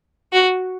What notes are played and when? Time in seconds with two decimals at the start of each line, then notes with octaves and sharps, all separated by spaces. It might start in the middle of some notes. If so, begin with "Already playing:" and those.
0.33 F#4